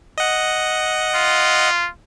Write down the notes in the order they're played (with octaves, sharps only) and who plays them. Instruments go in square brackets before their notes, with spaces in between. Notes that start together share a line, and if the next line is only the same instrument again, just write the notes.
[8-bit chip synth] D#5 F#5
[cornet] F4